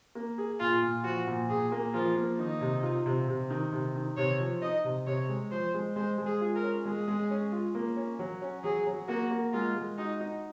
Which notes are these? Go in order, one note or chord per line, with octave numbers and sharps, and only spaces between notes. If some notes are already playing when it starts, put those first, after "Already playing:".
A#3
G#4
A#2 F4
A#2
F3 F#4
A#2
A#2 G#4
A#3
F3 F4
A#3
D#3 D#4
C3
F4
C3
C3
D#3
C3
D#3
C3 C#5
F3
D#4 D#5
C3
C3 C#5
G#3
F3 C5
G#3
G#3 C5
G#3
G#4
F4
A#4
C#4
G#3 G#4
G#3
C#4
F4
A#3
C#4
F#3
C#4
F#3 G#4
F#3
A#3 F#4
A#3
G#3 F4
G#3
D#4 F#4
D#4